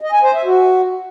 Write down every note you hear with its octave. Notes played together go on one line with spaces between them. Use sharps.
D#5
G#5
C5
E5
F#4